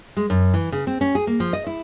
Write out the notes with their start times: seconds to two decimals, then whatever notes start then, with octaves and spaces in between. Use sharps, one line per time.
0.17 G#3
0.30 F#2
0.54 E3
0.72 C#3
0.87 C4
1.01 C#4
1.15 G#4
1.27 A#3
1.40 F3
1.53 D#5
1.67 E4